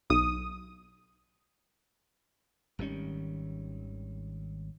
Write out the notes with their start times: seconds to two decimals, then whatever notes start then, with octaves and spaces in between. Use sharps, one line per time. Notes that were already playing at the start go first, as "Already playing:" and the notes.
0.10 B1 D#6
2.79 G#1 D#3 G3 C#4